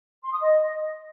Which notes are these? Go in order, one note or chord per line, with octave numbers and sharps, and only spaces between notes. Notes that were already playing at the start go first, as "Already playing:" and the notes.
C6
D#6
D#5